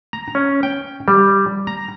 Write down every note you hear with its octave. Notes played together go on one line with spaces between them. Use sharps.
A#5
C#4
G5
G3
A#5